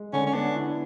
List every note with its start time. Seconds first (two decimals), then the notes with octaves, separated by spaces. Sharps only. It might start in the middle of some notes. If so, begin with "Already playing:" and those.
Already playing: G#3
0.13 D3 C#4
0.26 C#4
0.34 B3 D4
0.55 E4